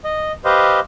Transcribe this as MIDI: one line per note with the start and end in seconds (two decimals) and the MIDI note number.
0.04 0.32 75
0.45 0.80 67
0.45 0.80 71
0.45 0.80 72
0.45 0.80 75
0.45 0.80 77